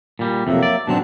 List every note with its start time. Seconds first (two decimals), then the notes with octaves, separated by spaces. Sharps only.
0.19 A#2 G3
0.47 F2 C3 F#3 A#3 E5
0.63 D5
0.88 G#2 B2 F#3 C4 D4 A5